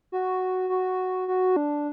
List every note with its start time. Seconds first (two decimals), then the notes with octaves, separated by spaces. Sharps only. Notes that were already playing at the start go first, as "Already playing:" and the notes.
0.12 F#4
0.69 F#4
1.28 F#4
1.56 D4